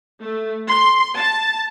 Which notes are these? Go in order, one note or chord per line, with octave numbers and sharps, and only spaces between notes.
A3
C6
A5